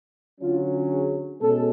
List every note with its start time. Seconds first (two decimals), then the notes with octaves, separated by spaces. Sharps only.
0.41 D3 F#3 C#4 F4
0.91 G#4
1.40 B2 G#3 C#4 A4